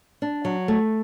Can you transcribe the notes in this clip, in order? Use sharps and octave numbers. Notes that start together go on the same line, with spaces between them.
D4
F#3
A3